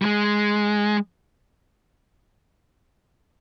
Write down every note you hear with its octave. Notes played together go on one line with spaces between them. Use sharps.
G3
G#3